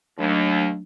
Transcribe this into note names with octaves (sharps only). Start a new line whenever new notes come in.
D#2 F#3 A3 D4